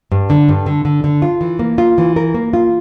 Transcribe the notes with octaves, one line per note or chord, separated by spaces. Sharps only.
G2
D3
G2
D3
D3
D3
F4
E3
A#3
F4
E3
A#4
A#3
F4